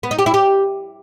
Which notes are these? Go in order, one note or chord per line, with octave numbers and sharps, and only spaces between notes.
B3
D#4
G4
E4
G4